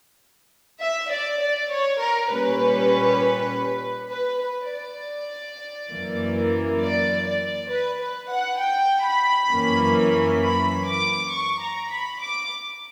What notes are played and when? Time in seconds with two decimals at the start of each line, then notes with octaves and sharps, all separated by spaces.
0.80 E5
1.10 D5
1.40 D5
1.70 C#5
2.00 A#4
2.30 A#2 G3 C#4 B4
4.11 B4
4.41 B4
4.71 D5
5.90 F#2 E3 A#3
6.81 D5
7.25 D5
7.70 B4
8.01 B4
8.31 F#5
8.61 G5
9.06 B5
9.51 F#2 E3 A#3 C#4
10.42 B5
10.86 D6
11.31 C#6
11.61 A#5
11.90 B5
12.21 D6